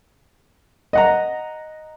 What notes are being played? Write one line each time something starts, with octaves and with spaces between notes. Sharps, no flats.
D#5 F#5 A#5